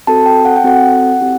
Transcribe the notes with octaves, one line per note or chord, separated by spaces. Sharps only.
C4 F#4 A4 A5
G5
F#5
G5
C4 F#4 A4 F#5
C4 E4 G4